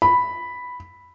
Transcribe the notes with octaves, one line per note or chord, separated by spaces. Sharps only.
B5